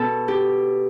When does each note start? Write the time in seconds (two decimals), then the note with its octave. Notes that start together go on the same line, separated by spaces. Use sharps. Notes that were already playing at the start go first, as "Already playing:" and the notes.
Already playing: B2 A4
0.28 G4